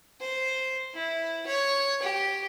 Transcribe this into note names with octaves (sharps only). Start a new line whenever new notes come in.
C5
E4
C#5
G4